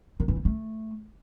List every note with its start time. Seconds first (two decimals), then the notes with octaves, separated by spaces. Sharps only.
0.20 D#3
0.28 E3
0.37 A#3
0.45 A3